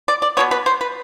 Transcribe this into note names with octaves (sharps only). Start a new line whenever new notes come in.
D5
D5
B2 G#3 B3 C#5
B4
C5
B4